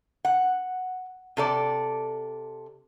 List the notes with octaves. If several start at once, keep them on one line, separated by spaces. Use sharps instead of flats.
F#5
C3 A4 D5